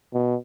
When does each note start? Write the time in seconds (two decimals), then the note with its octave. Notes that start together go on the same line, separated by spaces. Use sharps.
0.14 B2